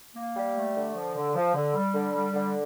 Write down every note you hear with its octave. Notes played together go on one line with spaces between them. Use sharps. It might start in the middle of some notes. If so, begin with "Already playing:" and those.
A#3
G3
A3
D3
F3
D3
F3
D3
G3
D3
G3
D3